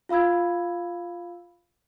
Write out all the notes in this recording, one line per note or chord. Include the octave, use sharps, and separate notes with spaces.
F4 F5 B5 E6 G#6